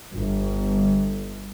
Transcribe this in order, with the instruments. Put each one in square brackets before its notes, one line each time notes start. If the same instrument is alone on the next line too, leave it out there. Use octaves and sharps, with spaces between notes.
[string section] G1